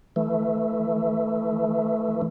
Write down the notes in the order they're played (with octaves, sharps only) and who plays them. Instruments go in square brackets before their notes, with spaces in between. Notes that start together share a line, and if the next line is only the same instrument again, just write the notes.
[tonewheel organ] E3 A3